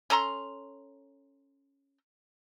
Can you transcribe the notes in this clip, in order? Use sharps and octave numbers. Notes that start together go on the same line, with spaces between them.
C#4 A4 A#5 C6